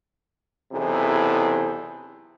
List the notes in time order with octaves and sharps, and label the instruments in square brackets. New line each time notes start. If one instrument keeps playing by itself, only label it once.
[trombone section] B1 E2 C3 E4 G#4 A4